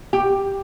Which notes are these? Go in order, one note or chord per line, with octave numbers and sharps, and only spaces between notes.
G4